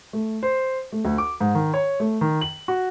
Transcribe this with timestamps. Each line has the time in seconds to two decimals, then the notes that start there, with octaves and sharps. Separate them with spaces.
0.13 A3
0.43 C5
0.92 A3
1.05 D2
1.18 D6
1.41 G#2
1.55 D#3
1.74 C#5
2.00 A3
2.21 D#3
2.41 F#7
2.68 F#4